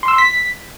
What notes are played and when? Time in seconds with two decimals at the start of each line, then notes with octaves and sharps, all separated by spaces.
0.03 C6
0.08 E6
0.13 C6
0.18 B6